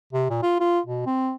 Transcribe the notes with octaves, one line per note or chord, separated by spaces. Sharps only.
C3
A#2
F4
F4
B2
C4